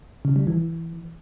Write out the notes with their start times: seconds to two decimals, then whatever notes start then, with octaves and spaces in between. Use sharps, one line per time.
0.25 C#3
0.36 G3
0.47 E3